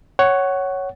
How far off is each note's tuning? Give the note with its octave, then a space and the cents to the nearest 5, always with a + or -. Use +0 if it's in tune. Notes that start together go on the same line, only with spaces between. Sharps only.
C#5 +0 F#5 +15